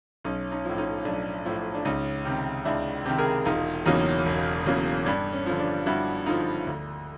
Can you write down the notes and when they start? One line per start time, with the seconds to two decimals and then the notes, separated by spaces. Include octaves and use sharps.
0.24 B1 C#4 D#4
0.51 C#4 D#4
0.65 A2 F3
0.78 C#4 D#4
1.05 B1 D4
1.45 A2 F3
1.75 D4
1.85 C#2 C#4 D#4
2.25 C3 D#3
2.65 C#2 D4 E4
3.05 C3 D#3
3.18 G#4 A#4
3.45 E1 D#4 F4
3.86 E2 C#3 F#3 A#3 C#4 D#4
4.25 E1
4.66 E2 C#3 F#3 A#3
5.06 G2 D4
5.33 C#4
5.46 D3 F3
5.59 D4
5.86 G2 E4 F#4
6.26 D3 F3 D#4 F4
6.67 D2